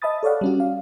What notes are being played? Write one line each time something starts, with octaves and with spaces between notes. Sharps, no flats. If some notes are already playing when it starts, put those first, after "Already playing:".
D#5 E5 A5 B5 D#6 A6
A4 C#5 D5 F5 F#5
G3 C#4 F#4
F5